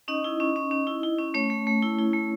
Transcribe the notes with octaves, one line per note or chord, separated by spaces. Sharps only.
C#4 D#4 D#5
E4
C#4
C#4
C#4
E4
E4
C#4
A3 C#4 C#5
A3
A3
E4
E4
A3